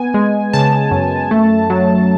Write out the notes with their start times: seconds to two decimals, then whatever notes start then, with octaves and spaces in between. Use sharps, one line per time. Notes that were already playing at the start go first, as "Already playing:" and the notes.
Already playing: B3 G#5
0.14 G#3
0.53 C#3 A5
0.91 F#2
1.31 A3
1.70 F#3